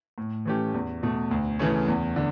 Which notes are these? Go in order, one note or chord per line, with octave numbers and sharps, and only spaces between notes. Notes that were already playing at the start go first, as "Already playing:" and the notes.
A2
E3 A3 C#4 G4
E2
B2 A3
D2
C#3 E3 A3 C#4
E2
D3